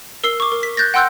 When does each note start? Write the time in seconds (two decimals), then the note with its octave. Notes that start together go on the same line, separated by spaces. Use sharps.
0.24 A#4 E6 C7 G7
0.40 C#6 D6
0.52 A#4
0.63 B6
0.77 F#6 G6 A6 A#6
0.94 F#5 G5 C6 E6 F#6 G6